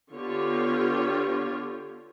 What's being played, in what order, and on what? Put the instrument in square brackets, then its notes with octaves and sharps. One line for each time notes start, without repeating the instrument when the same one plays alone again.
[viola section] D3 B3 F4 G4 C#5